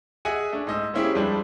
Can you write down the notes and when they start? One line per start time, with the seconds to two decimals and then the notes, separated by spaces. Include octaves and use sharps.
0.25 G#4 D#5 E5 F#5 G#5
0.52 A3 D4
0.67 G#2 D#5 E6
0.94 A#3 C4 C#4 E4 G4 G#4
1.15 F2 G3 G#3 D4 B4 A5